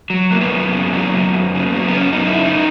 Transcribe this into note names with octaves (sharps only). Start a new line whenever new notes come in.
F#3
F#2 A#3
B3
F#2
C#3
F#3
F#2
F#2
C#3
F#3
B3
F#2 C#4
F#2 D#4
E4
C#3
D#4